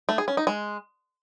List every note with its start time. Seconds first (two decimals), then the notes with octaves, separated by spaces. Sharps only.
0.09 A3
0.18 G#4
0.28 C#4
0.37 D#4
0.47 G#3